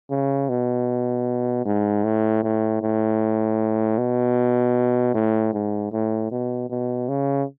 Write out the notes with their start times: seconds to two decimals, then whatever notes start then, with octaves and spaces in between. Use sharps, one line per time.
0.11 C#3
0.49 B2
1.65 G#2
2.04 A2
2.43 A2
2.82 A2
3.98 B2
5.14 A2
5.54 G#2
5.92 A2
6.31 B2
6.70 B2
7.09 C#3